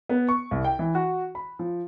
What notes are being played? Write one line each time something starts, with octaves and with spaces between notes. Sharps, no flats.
B3
C#6
C2
G5
E3
F#4
B5
F3